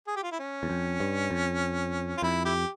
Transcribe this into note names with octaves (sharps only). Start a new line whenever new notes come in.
G#4
G4
F4
E4
C#4
E2
F2
G2
F2
F4
F2 E4
E4 G4